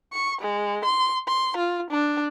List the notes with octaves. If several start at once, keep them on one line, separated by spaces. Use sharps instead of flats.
C#6
G#3
C6
C6
F4
D4